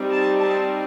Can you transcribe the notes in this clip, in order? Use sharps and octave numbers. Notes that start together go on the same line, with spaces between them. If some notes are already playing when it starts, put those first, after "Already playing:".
Already playing: G3 C4 D#4
A5
A5